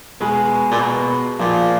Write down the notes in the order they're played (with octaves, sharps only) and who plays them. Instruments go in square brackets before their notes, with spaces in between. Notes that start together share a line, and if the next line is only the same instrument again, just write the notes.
[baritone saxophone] B2 [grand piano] G#3 G#4
[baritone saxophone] A#2
B2
[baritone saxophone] A#2 [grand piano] F3 F4